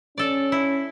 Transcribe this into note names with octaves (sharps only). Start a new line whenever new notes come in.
C#4 A4 D5
E4